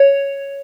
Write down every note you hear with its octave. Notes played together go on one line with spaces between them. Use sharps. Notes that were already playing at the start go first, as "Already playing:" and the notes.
Already playing: C#5